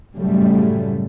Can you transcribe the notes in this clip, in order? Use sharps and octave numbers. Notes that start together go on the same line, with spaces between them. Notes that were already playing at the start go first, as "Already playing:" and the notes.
F#2 A2 C#3 F#3 G3 A3